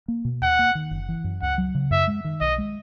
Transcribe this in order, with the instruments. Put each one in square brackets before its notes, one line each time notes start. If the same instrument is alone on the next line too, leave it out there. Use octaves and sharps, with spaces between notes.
[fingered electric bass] A#3
B2
[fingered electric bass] D#2 [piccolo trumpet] F#5
[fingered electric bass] A#3
D#3
F#1
E3
F#2
[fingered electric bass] C#2 [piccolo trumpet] F#5
[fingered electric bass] F#3
C#3
[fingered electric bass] F#2 [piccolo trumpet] E5
[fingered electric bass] G#3
D#3
[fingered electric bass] B1 [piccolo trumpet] D#5
[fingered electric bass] G#3